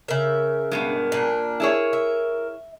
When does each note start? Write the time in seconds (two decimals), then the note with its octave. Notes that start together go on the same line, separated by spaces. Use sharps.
0.08 C#3 A#4 E5
0.71 G2 B2 G#3
1.12 A#2 D4
1.60 E4 G#4 C#5
1.93 E5